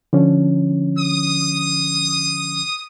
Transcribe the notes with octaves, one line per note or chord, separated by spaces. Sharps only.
D3 F3 C#4
D#6